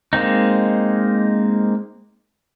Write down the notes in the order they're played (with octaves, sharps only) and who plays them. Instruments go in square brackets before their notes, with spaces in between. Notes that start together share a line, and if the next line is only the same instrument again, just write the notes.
[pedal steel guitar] G#3 A#3 C4 D#4